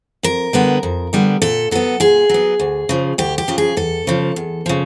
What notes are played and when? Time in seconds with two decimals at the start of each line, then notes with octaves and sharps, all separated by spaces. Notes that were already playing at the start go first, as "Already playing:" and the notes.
0.23 F2 A#4
0.53 D3 G3 B3
0.83 F2
1.13 D3 G3 B3
1.42 A#2 A4
1.71 F#3 B3 A4
2.00 A#2 G#4
2.29 F#3 B3
2.59 D2
2.89 C#3 F3
3.18 D2 G4
3.38 G4
3.48 C#3 F3
3.58 G#4
3.77 E2 A4
4.07 C#3 F3
4.36 E2
4.66 C#3 F3